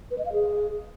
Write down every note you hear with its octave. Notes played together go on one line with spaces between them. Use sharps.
B4
D#5
F5
G#4